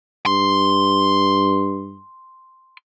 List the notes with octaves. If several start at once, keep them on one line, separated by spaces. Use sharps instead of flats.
G2 C6